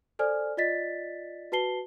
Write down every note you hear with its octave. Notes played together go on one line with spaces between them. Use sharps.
A4 C5 D5 G#5 F6
F4 D5 D#5 A6 B6
F#4 B4 A5 C7 G7